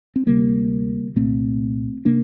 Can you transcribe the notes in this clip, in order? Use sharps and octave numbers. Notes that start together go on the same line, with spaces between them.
C4
D2 C3 G3 A#3
C2 A#2 A3 C4
C3 A#3 D4